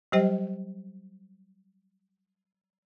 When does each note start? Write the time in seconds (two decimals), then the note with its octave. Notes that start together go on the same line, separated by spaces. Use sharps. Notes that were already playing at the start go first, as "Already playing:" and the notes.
0.12 F#3 G3 G4 C5 G5